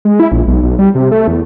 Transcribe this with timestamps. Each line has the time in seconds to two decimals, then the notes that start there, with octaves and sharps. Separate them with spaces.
0.05 G#3
0.20 E4
0.32 A#1
0.47 B1
0.63 B1
0.79 G3
0.95 C3
1.11 A3
1.28 E2